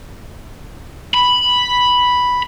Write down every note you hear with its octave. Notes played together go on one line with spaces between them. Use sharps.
B5